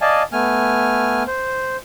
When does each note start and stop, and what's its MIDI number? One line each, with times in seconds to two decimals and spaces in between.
0.01 0.23 74
0.01 0.23 75
0.01 0.23 77
0.01 0.23 80
0.01 0.23 81
0.33 1.23 57
0.33 1.23 59
0.33 1.23 80
0.33 1.23 89
1.27 1.77 72